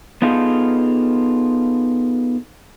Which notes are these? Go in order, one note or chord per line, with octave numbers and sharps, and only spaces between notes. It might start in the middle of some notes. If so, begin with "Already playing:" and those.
B3 D#4 F4 G#4 A4